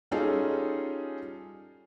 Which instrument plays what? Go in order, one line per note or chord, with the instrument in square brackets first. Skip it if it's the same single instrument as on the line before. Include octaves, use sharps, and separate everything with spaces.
[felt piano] G3 C#4 D#4 F4 G#4 A4